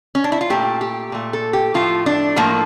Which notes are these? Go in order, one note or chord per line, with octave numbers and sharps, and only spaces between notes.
C#4
D4
E4
F4
A#2 A3 G4
G4
A#2 A3
A4
G4
A2 F3 A3 F4
D4
A2 F3 A3 A#3